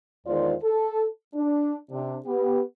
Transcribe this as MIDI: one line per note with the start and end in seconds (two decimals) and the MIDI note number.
0.26 0.53 40
0.26 0.53 51
0.26 0.53 56
0.26 0.53 65
0.26 0.53 72
0.26 0.53 74
0.62 1.05 69
1.34 1.74 62
1.90 2.17 48
1.90 2.17 62
2.26 2.60 59
2.26 2.60 67